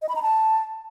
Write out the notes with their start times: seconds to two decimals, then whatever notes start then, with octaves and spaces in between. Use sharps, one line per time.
0.02 D#5
0.09 B5
0.16 A#5
0.22 A5